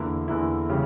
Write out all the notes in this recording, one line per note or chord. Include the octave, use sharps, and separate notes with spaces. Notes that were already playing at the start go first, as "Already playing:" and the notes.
Already playing: E2 D3 A#3 E4
E2 D3 A#3 E4
C#3 E3 G3 C#4